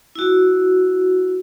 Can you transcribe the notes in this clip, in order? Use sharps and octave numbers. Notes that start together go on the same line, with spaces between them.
E4 F#4